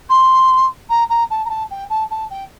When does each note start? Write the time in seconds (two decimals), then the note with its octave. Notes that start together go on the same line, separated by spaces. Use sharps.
0.09 C6
0.89 A#5
1.09 A#5
1.30 A5
1.45 A#5
1.49 A5
1.70 G5
1.90 A5
2.10 A5
2.30 G5